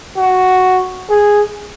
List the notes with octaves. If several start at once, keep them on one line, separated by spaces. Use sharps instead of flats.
F#4
G#4